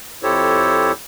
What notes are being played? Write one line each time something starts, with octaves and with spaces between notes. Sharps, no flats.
F2 E4 G4 A4 C5 C#5